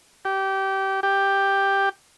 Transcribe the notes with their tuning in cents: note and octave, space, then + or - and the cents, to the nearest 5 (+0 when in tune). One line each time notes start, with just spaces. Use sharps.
G4 -20
G4 +5